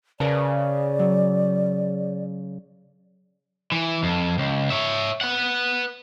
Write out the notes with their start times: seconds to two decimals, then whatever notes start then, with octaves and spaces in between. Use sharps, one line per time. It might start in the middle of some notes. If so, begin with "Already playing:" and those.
0.20 C#3 A#4 B4 D5 A5
0.99 F#3
3.72 E3
4.03 F2
4.38 C#2
4.70 C#5 E5
5.21 B4 F#5